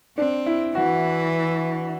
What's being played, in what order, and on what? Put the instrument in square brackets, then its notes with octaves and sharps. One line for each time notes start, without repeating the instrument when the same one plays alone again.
[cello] C4 [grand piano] D4
[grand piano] E4
[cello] E3 [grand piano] F#4